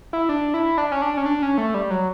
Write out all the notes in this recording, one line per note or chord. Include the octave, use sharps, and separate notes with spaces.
E4
D4
E4
D4
C#4
D4
C#4
D4
C#4
A3
G3
F#3